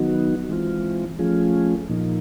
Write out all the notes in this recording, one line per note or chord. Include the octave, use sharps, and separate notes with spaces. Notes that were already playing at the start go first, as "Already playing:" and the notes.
Already playing: D#3 F#3 B3 D#4 F#4
E3 G#3 C4 F4
F3 A3 C#4 F4 G#4
A#2 F3 A#3 D#4